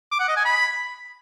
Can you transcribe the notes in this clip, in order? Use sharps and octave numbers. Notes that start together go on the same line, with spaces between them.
D6
F#5
D#5
G#5
B5